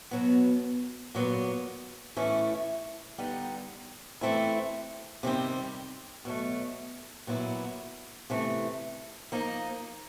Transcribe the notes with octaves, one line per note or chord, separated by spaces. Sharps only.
B2 F#3 B3
A#2 F#3 B3
A2 E3 A3 C#4 E4
D3 G3 B3 D#4
E3 A3 C4 E4
C3 D#3 G3 C4
B2 F#3 A3
A#2 F#3 B3 E4
C3 E3 A3
F3 A#3 D#4